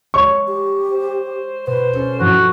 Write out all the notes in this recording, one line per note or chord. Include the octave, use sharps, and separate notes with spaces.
G#3 C#5 C#6
G4
C5
B2 B4 C5
C#4 A4
G2 F3 E4 F#4